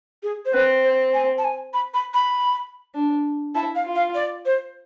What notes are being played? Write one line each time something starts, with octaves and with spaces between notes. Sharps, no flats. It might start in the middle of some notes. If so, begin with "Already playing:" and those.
G#4
C5
C4 B4
C5
G#5
A5
G#5
B5
B5
B5
D4
E4 A5
F5
F4
F5
D5
C5